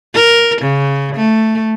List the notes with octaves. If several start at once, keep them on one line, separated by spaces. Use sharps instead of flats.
A#4
C#3
A3